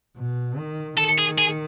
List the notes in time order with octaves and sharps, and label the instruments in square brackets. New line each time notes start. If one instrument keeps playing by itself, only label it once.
[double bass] B2
D#3
[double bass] D#3 [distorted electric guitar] A4
[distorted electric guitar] G#4
G#4